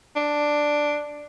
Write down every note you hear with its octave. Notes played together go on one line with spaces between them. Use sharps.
D4